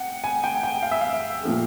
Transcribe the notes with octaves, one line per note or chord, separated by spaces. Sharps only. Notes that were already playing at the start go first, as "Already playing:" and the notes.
Already playing: F#5 G5
G#5
G5
G5
F5
E5
F5
A#2 F3 A3